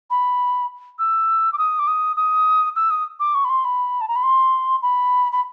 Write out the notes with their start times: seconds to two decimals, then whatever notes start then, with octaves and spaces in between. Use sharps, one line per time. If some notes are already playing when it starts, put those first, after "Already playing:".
0.10 B5
0.99 E6
1.53 D6
1.58 D#6
1.79 D6
1.87 D#6
2.16 D#6
2.76 E6
2.90 D#6
3.20 D6
3.35 C#6
3.45 B5
3.49 C6
3.65 B5
4.01 A5
4.08 A#5
4.16 B5
4.23 C6
4.82 B5
5.32 B5